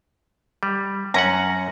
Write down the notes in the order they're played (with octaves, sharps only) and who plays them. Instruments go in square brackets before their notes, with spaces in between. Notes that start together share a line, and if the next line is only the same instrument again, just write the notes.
[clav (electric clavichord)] G3
[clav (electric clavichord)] F#2 C#4 F#5 [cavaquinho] A#5